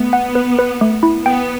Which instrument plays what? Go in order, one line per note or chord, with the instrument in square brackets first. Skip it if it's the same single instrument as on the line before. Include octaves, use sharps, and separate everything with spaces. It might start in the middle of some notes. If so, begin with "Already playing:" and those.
Already playing: [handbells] A3 [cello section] B3
[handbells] F#5
B4
B4
A3
E4
[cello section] B3 [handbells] G5